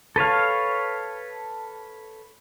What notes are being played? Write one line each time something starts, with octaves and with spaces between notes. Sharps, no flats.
A4 B4 C#5 F5